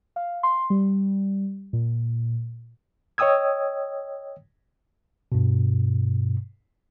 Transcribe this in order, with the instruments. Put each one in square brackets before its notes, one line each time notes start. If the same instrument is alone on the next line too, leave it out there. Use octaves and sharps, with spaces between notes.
[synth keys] F5
C6
G3
A#2
[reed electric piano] C#5 D#5 G5 D#6 E6 G#6
[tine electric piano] G2 B2